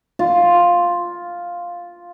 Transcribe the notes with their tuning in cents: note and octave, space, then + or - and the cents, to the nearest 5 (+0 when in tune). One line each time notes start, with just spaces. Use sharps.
F4 +0